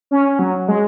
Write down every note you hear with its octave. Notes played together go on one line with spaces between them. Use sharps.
C#4
F#3
G#3